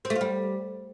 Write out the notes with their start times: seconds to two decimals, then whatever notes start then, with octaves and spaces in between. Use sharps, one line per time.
0.05 C4
0.10 A3
0.16 F4
0.21 G3